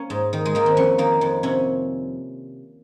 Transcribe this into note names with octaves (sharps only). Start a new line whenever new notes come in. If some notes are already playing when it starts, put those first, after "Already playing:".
Already playing: A#3 C#4
G#2
D#3
G#3
D#3 A#3
C4
F2 C#4
D#3 A#3
F2
C3 C#4